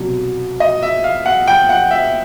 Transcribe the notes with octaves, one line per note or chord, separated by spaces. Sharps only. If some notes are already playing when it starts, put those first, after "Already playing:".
Already playing: C2 B2 F#3
D#5
E5
F5
F#5
G5
F#5
E5